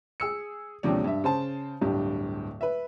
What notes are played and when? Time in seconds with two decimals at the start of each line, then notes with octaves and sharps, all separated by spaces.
0.20 G#4 E6 C#7
0.83 D#2 G#2 C3 F3 C#4 D4
1.04 G2 E5
1.24 C#3 C5 A5
1.81 D1 G2 G4
2.61 B4 E5